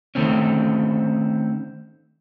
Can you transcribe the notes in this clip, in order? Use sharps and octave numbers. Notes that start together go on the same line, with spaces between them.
D#3 A3 C4 C#4